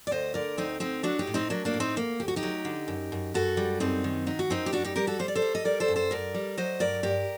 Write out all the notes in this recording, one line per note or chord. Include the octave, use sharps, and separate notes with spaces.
D5
D2 C5 D#5
D3 A#4 D5
D2 C4 D#4
D2 C4 D#4
F#3 D4 F#4
D#4 G4
A2
C4 D#4
F#3 A#3 D4
A#3 D4
A2
C4 D#4
D2 A#3
D2 G4
F#4
D#4 G4
F#3
D3
F#2
F#2
F#2 F#4 A4
G3
F#2 C4 D#4
D#3
F#3 D#4
F#4
F#2 C4 D#4
G4
G3 D4 F#4
D#4 G4
G3 G4 A#4
F#4 A4
G3 C5
D5
A4 C5
G3
D#5
G3 A#4 D5
A4 C5
F#2
A4 C5
F#2 A#4 D5
G3
F#3 C5 D#5
G2 A#4 D5
G2 G4 A#4